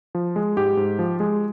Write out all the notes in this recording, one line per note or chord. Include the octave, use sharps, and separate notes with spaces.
F3
G#3
G#2 G4
G#2
F3
G#3